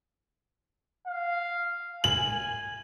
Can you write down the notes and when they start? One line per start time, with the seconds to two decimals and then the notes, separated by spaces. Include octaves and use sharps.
1.07 F5
2.04 G#5 F#7